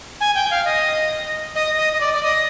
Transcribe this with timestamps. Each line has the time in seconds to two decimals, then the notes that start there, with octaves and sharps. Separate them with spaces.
0.20 G#5
0.35 G5
0.50 F5
0.65 D#5
1.55 D#5
1.77 D#5
1.93 D#5
2.00 D5
2.13 D5
2.23 D#5